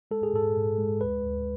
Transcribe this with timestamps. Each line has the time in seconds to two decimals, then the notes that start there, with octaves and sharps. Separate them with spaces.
0.11 G#3 A4
0.23 G#4
0.33 G#2 A4
0.56 G#2
0.78 G#3
1.01 D2 B4
1.24 D2